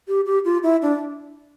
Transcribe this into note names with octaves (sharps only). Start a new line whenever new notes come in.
G4
G4
F4
E4
D4